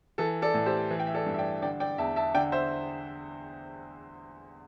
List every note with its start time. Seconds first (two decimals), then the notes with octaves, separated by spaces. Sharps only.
0.18 E3 A4
0.42 A4 D5
0.54 A2
0.66 G4 C5
0.91 E3
1.00 G5
1.07 E5
1.14 A4 D5
1.26 G2
1.34 E5
1.39 D5 G5
1.62 D3 D5 G5
1.80 D5 G5
1.98 E2 E5 A5
2.16 E5 A5
2.34 D3 D5 G5
2.52 C5 E5